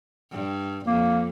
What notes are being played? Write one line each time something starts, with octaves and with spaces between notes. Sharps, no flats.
G2
F2 A#3